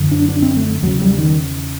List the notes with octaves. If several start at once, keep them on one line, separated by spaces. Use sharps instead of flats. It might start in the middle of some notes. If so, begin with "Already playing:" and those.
Already playing: F#2 D3
D4
D4
C4
A3
E2 C#3 F#3
G3
D#3